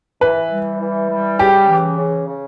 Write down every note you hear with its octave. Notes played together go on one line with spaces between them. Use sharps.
E3 B4
G3
E3
G3
C#3 G4
E3
C#3
C#3